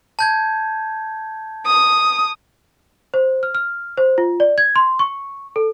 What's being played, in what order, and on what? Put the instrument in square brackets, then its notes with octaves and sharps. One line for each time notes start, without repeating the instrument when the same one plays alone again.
[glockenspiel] A5 G6 G#6
[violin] D#6
[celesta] C5
F6
F6
C5
F4
D5
G#6
C6
C#6
A4